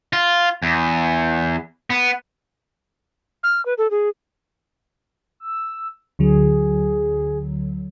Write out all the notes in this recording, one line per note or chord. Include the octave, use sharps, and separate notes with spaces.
F4
E2
B3
F6
B4
A4
G#4
E6
D2 D3 F#3 G#4